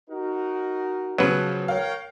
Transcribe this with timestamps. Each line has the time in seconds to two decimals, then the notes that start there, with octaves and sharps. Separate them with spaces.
0.10 D#4 F#4 A#4
1.18 C#3 F3 F#3 B3 B4
1.68 A#4 C#5 F5 G5